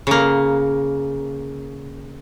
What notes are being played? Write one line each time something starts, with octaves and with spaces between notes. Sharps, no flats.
C#3 A#3